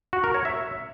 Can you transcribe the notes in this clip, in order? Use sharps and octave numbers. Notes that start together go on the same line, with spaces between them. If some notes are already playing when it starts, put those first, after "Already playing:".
F#4
A#4
C#5
E5